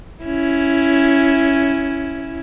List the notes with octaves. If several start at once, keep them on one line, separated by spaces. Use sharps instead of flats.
C#4 E4